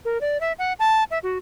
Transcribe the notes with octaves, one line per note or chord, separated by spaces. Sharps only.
A#4
D5
E5
F#5
A5
E5
F#4